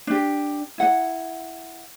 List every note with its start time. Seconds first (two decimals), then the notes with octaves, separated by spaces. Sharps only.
0.07 D4 G4
0.78 E4 F#5